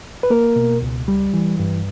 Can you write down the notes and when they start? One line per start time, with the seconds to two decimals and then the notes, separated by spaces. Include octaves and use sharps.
0.23 B4
0.30 A#3 A#4
0.56 B2
0.82 C#2
1.08 G3
1.34 E3
1.59 G2